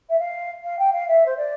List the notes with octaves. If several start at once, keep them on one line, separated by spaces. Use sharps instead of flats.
E5
F5
F5
G5
F5
E5
C5
D5